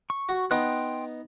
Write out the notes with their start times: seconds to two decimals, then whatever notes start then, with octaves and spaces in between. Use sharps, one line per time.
0.10 C#6
0.29 F#4
0.51 B3 D#4 G5 C6 F#6